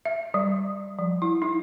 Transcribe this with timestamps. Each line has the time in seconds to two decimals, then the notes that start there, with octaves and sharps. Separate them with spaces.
0.05 E5
0.34 G3
0.99 F3
1.22 E4
1.42 D#4